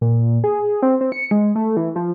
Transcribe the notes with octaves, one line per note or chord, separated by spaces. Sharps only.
A#2
G#4
C4
C4
C#7
G#3
A3
E3
F3